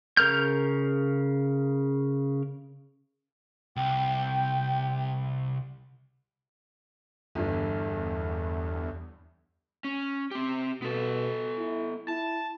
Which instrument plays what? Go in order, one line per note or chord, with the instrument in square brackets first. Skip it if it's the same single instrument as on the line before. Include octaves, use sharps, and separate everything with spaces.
[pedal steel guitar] C#3 A#4 F6 G6
[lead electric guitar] C2 [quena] G5
[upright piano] G1 G2 [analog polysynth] E2
[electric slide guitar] C#4
C4 G4
[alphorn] B2 [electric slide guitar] B3 A4
[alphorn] E4
[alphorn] E4 [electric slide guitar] A5